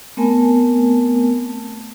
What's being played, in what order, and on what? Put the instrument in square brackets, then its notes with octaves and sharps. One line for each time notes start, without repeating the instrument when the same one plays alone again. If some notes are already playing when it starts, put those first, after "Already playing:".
[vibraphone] A3 B3 C4 A#4 G#5 A5